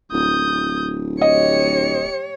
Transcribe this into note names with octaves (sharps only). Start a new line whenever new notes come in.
D1 D#6 G6
G4 C#5 D#5 C#7